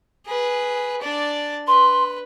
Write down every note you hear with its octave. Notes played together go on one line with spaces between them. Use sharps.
G#4 B4
D4 D5
B4 C6